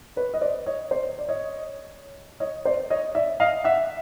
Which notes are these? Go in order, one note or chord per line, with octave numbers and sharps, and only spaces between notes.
B4 C#5
D#5
C5 D5
C#5 D#5
C5 D5
D5
C#5 D#5
C#5 D#5
C5 D5
C#5 D#5
D5 E5
D#5 F5
E5 F#5